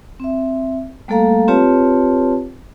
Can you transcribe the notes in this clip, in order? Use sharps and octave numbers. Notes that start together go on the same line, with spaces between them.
C4 E5
G3 A3 A#3 A4 F5 A#5
C4 F4 G4 B4 C#5 A5